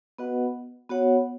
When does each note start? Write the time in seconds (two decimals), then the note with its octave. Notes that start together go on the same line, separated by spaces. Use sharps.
0.19 B3 F#4 B4 D#5 F#5
0.90 B3 F#4 C#5 F#5